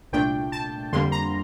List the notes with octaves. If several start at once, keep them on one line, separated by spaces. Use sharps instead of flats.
C2 A#2 A3 D4 G5
A5
F2 D3 G3 A#3 C6
A#5